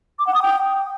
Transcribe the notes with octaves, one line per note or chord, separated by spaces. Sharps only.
D6
F#5
D#6
G5